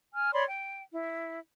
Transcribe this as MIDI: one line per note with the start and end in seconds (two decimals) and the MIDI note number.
0.14 0.30 80
0.14 0.30 89
0.33 0.44 73
0.33 0.44 74
0.33 0.44 83
0.33 0.44 84
0.48 0.83 79
0.92 1.40 64